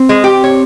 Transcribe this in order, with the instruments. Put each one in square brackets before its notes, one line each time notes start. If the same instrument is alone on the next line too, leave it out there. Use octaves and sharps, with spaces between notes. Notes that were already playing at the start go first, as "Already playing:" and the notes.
Already playing: [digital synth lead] C4
[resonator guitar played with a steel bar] G#3
G4
C#5